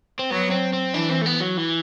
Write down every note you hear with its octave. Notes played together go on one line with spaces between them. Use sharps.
C4
F#3 B3
C4
C4
E3 D4
C4
A3
B3
F#3
E3